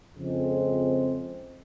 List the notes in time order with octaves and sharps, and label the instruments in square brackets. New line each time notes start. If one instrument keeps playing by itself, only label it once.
[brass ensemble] F2 C#3 F3 G#3 C4